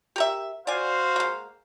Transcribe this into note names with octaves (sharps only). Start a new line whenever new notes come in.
G4 A#4 E5
F#4 C5 D5 F5 G#5
G#3 A#3